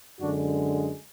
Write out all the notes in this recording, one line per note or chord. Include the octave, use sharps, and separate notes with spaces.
F#2 D3 G#3 D4 F#4